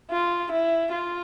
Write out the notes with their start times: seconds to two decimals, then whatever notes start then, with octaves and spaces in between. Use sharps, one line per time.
0.11 F4
0.51 E4
0.92 F4